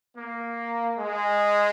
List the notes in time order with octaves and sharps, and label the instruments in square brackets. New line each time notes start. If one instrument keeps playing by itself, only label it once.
[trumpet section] A#3
G#3